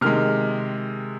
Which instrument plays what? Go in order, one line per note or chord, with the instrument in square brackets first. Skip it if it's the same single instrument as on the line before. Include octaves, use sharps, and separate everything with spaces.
[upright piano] C3 D#3 G#3 F6